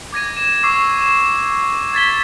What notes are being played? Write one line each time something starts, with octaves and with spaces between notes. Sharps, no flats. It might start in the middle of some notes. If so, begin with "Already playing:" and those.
D6 G#6 A#6 D#7
E7
C#6 D6 E6 C7
E7
G#6 A6 B6 G7